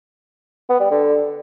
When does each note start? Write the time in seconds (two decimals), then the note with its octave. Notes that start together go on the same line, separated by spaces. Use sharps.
0.69 B3
0.80 G3
0.91 D3